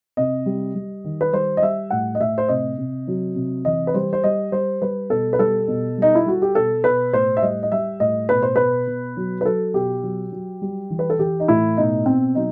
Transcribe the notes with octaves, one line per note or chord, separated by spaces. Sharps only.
C3 D#5
G3
G3
D#3
B4
G3 C5
D#5
G3 E5
A2 F#5
D#5
A2 E5
C5
C3 D#5
C3
F#3
C3
E3 D#5
B4
G3 C5
C5
G3 D#5
G3 C5
G3 B4
B2 A4
B4
G3 A4
B2
G3 D#4
E4
G3 F#4
G4
B2 A4
B2 B4
A2 C5
E5
G3 D#5
D#5
G3 E5
A2 D#5
B2 B4
C5
B2 B4
B2
F#3
B4
F#3 A4
B2 G4
F#3
F#3
G3
E3
B4
A4
E3 G4
D#4
A2 E4
B2 D#4
B2 C4
F#3 D#4